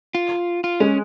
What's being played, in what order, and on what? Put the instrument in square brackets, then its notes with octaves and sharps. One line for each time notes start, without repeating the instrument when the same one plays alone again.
[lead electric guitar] F4
F4
[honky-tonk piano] G#3 [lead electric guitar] C#4